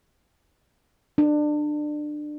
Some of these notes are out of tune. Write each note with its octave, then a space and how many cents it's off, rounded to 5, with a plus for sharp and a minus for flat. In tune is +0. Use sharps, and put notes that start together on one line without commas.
D4 +25